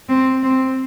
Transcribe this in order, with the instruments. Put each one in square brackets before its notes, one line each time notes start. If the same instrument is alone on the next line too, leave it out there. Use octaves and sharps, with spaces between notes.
[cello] C4
C4